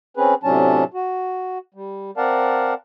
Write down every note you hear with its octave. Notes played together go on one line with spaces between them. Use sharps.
C4 C#4 G#4 B4
A2 C3 F#3 C#4 D4 A5
F#4
G3
C4 A#4 D5 F5 F#5 A5